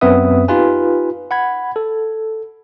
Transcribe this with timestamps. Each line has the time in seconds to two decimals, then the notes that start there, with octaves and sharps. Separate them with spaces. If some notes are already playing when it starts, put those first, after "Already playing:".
0.01 F#2 B3 C4 B4 E5 D#6
0.48 D#4 F4 G4 B4 G#5
1.31 F#5 B5 G#6
1.76 A4